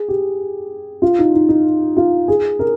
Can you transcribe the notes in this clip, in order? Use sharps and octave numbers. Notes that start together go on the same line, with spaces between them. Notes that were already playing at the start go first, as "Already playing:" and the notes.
Already playing: G#4
G4
F4
D#4
D#4
D#4
F4
G#4
A#4